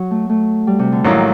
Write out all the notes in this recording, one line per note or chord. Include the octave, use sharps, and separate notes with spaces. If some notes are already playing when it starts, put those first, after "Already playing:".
Already playing: F#3
A3
A3
G3
C3
D3
A1 A2 D#3 F#3 A#3